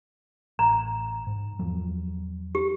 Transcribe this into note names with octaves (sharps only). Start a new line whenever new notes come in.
A1 A#5
G#2
E2 F3 F#3
G4